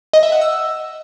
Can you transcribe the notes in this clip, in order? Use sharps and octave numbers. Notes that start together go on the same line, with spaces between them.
D#5
E5
F#5
E6